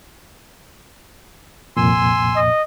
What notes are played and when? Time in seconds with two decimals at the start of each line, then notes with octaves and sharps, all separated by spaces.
1.77 C2 F2 A#2 G#5 C6 E6
2.36 D#5